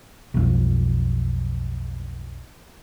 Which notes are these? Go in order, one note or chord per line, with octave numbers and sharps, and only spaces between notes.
B1 F2